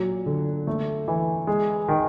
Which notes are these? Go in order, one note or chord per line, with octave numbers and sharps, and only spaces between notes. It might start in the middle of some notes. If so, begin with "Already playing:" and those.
Already playing: A#2 F#3
D3
A3
E3
G#3
D#3